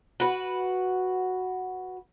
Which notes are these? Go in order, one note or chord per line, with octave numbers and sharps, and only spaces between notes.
F#4 B4